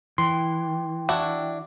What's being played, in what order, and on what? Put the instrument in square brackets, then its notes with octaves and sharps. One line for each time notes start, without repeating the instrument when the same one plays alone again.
[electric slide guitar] E3 [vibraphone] G5 [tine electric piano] C6
[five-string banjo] D4 E4 F#4